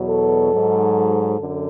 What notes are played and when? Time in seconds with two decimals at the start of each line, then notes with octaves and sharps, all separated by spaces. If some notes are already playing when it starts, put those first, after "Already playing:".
Already playing: E2 B2 F#3
0.08 A4
0.51 G#2 F#3
1.39 F#2 D3